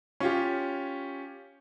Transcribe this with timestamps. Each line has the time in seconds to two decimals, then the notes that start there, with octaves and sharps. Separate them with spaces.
0.20 C#4 F4 G4